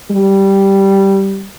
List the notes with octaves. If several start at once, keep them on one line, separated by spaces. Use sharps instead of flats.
G3